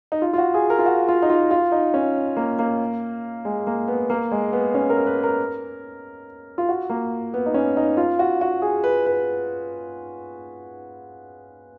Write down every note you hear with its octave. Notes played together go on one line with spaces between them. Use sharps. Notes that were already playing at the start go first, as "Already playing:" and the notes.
D#4
F4
F4
F#4
G#4
A#4
F4
F#4
F4
D#4
F4
F4
D#4
C#4
A#3
A#3
G#3
A#3
B3
A#3
G#3
B3
C#4
A#4
B4
A#4
F4
F#4
A#3
B3
D#4
C#4
D#4
F4
F#4
F#4
G#4
B4
B4